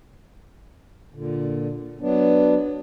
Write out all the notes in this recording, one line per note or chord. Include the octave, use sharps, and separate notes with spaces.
A#2 D3
F#3 B3 D4